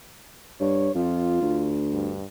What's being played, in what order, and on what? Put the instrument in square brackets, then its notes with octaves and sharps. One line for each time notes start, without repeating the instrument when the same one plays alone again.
[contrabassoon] G2 [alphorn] C#5
[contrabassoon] F2 [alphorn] F4
[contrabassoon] D2
[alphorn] G2